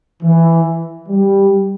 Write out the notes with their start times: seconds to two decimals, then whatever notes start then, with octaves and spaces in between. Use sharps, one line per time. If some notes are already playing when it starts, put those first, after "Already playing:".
0.23 E3
1.09 G3